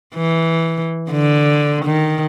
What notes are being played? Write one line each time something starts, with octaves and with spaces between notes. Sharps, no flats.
E3
D3
D#3